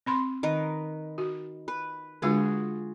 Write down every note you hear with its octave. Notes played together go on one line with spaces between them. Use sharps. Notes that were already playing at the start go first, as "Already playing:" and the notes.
C4 B5 C6
D#3 A#4 B4
F#4
B4
D3 G#3 D4 F4 F#4 G#4